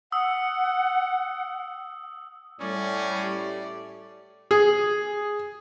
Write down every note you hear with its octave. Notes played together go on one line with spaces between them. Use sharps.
F#5 D#6 E6
A2 G3 C#4 D5
G4
G#4